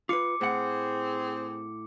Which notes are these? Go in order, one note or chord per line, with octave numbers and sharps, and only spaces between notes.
F4 B4 D6 C#7
A2 C4 G#4 F#5